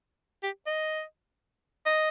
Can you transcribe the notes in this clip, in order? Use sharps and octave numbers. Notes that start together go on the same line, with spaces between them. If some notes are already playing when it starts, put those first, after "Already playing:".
G4
D#5
D#5